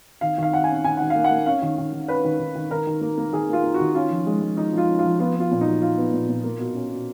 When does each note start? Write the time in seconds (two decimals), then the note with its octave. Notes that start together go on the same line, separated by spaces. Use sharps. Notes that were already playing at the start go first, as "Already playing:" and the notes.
0.21 D#3 F5
0.38 D#3 F5
0.53 D#3 F#5
0.64 C#4 G#5
0.84 D#3 G#5
0.97 D#3 F#5
1.10 F5
1.15 A#3
1.24 F#5
1.31 A#3
1.46 C#4 F5
1.62 D#3
1.78 D#3
1.93 D#3
2.08 C#4 B4
2.24 D#3
2.39 D#3
2.55 D#3
2.71 D#3 A#4
2.87 D#3
3.01 A#3
3.18 A#3
3.32 D#3 G#4
3.49 A#3 F4
3.64 A#3
3.74 F#4
3.80 D#3
3.95 C#4 F4
4.10 F3
4.26 G#3
4.41 G#3
4.57 F3 D#4
4.72 F3
4.77 F4
4.89 C#4
4.99 F4
5.04 F3
5.19 B3 F4
5.36 B3 F4
5.51 A#2
5.61 F#3 D#4
5.81 F#3 F4
5.98 B3
6.13 A#2
6.29 A#2
6.44 A#3
6.59 B2
6.75 C#4
6.90 B2